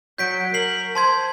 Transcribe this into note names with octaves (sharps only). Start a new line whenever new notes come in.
F#3 G6 B6 D7
A#4 C7 F#7
C5 A5 C6 G#6